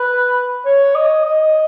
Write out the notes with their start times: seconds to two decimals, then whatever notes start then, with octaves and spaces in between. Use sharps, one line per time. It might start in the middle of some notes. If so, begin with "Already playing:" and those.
Already playing: B4
0.66 C#5
0.95 D#5
1.25 D#5